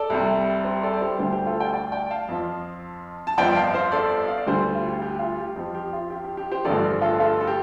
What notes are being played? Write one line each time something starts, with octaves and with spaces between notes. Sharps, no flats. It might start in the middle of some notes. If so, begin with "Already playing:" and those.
Already playing: A4 D5
C2 C3 G3
G4 C5
A4 D5
D5
G4 C5
D2 D3 G3 G4 C5
G4 C5
F4 A4
D5 G5
D5 G5
D5 G5
F5 A5
F2 F3
A5
G1 F2 F3 D5 G5
F5 A5
C5 F5
A4 D5
F5
D5
D2 D3 G3 G4 C5
F4
G4
G4
F4
G4
F2 F3 G4
G4
F4
G4
G4
G4
G4 C5
A1 G2 D3 F3 A4 D5
F4 A4
F4 A4
A4
G4